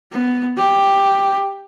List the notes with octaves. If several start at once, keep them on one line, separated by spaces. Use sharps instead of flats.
B3
G4